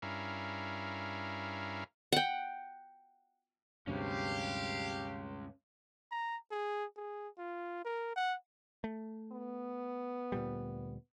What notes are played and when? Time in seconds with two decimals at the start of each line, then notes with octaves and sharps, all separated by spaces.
0.02 G2 C#4 E4 A#4 F5
2.12 F#5 G5
3.87 D2 G2 C3 G#3 C#4 G4 F5
6.11 A#5
6.51 G#4
6.97 G#4
7.38 F4
7.85 A#4
8.16 F#5
8.84 A3
9.32 B3
10.32 D2 A#2 G3